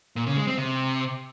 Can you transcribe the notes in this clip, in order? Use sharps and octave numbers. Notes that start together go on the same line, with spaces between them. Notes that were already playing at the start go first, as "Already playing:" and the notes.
A#2
C#3
G#3
C4
C3